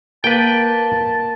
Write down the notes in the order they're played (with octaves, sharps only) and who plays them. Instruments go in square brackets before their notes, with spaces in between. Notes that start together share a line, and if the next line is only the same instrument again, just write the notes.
[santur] A#3 [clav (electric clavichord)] B4 G5 [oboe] A5